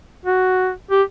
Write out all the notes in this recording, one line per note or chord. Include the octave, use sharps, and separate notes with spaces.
F#4
G4